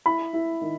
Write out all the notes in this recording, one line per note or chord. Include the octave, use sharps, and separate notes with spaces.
E4 B5
E4
D#3